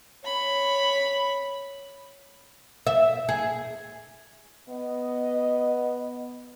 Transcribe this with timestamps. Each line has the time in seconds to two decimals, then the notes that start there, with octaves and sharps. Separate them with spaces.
0.24 C#5 B5
2.87 E5
3.29 G#4
4.69 B3 D#5